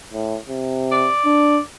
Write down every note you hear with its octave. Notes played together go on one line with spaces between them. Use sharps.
A2
C3
D5
D4